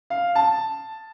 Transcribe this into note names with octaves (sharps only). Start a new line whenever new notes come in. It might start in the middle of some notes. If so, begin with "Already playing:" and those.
F5
A5